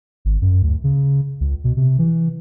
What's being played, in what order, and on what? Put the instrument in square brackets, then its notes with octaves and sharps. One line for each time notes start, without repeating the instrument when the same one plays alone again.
[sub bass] G#1
F#2
D2
C#3
C#2
B2
C3
E3